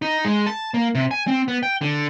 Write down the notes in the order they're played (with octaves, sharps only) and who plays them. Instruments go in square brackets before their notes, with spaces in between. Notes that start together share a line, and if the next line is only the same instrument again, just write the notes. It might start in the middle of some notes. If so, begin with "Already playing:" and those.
[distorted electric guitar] D#4
G#3
A5
A#3
C3
G#5
C4
B3
G5
D3